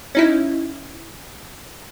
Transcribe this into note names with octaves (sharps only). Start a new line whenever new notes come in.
C#4 D#4 E4